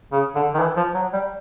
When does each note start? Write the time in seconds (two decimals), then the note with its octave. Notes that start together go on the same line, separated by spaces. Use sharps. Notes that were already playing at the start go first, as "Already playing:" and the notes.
0.12 C#3
0.36 D3
0.54 D#3
0.60 E3
0.77 F3
0.94 F#3
1.13 G3